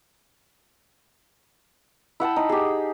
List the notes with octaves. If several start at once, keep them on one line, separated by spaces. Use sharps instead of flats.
E4 F#5 G5 A5
D#4
G4 G#4